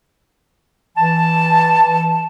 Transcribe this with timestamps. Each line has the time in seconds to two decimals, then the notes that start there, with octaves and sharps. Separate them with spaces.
0.97 E3 A5